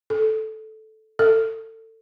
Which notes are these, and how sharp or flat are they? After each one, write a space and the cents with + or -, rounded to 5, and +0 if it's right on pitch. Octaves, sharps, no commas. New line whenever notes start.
A4 -10
A4 +25